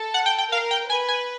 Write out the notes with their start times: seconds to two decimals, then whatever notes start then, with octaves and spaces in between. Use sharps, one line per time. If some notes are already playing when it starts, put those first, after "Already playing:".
Already playing: A4
0.14 F#5
0.26 G5
0.38 G5
0.52 A#4 F5
0.71 G5
0.89 B4 G#5
1.08 G#5